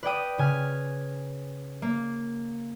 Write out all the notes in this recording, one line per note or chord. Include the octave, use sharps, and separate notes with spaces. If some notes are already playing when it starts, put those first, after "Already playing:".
B4 D5 G5 D#6
C#3 G#5 F6
A#3